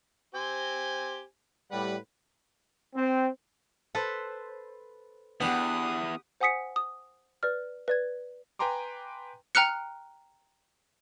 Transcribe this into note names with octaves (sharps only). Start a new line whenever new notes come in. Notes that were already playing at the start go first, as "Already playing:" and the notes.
C4 G4 C5 G#5
A2 G3 B4 F#5
C4
A4 B4 C5
E2 B3 D4 G4 F#5 B5 D#6
C5 F#5 G#5 D#6 B6 C#7
D#6
B4 D5 F6
B4 D5 G#6
B4 G5 G#5 A#5 C6 D6
G5 A#5 F6 F#6 C#7